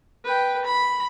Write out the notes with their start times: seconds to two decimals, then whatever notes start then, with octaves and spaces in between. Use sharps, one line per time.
0.25 B4 G5
0.65 B5